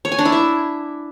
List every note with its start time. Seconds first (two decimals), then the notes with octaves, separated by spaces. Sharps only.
0.05 C#5
0.12 G#5
0.19 D4
0.25 E4
0.32 E5